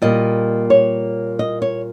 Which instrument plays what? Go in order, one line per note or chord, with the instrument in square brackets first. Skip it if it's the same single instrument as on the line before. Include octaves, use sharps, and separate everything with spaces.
[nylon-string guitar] A#2 G3 A#3 D#5
C#5
D#5
C#5